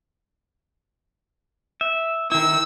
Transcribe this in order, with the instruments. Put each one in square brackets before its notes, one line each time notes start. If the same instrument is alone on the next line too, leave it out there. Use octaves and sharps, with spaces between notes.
[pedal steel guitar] E5
[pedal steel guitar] D#3 E4 [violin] E6